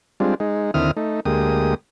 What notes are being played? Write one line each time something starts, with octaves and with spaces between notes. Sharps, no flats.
G3 G#3 C4 D4 F4
G#3 D#4
D#2 D3 C4 E4 D#6 F6
A3 D#4
D2 G#3 A#3 G4 D#6